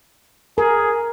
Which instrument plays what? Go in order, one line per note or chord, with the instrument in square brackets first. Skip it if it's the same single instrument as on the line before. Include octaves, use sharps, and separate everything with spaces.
[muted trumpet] G#4 [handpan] A#4